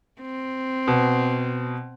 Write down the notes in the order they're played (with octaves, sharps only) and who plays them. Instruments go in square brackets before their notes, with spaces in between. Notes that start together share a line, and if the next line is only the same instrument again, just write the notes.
[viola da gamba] C4
[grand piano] B2